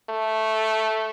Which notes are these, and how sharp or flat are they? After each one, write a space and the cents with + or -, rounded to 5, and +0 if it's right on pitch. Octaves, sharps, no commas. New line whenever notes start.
A3 -5